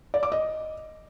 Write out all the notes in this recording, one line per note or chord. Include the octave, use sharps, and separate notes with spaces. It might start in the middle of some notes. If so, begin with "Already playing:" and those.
D5
D6
D#5